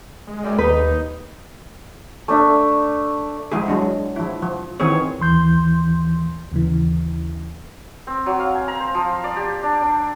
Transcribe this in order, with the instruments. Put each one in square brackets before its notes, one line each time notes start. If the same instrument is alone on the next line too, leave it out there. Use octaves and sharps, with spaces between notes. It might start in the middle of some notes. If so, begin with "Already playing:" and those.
[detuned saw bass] G#3
[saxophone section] F#2 G3
[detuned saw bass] D#2 [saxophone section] D#4 [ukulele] B4
[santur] A3 D4 E5
[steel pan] F3 G#3 E4 G#4
F#3 G#3 D4
F3 E4
F3
D#3 E3 C4 G#4 C#5
[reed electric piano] D#2 E3 C6 G6
[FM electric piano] D#2 C#3 E3
[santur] C4
F#3
F5
G#5
A#5
C5
F3
D5
G4
D4
D4